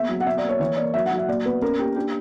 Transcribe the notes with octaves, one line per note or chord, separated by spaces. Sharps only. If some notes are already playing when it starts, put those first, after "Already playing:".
Already playing: E2 A#3 E5
F#3
F#5
B2 E5
D5
A#3
C#5
E3 C#5
A#3 D5
F#3 E5
F#5
F#3
E5
A#2 D5
B3 B4
C#4 A#4
A#3 G4
D4 G4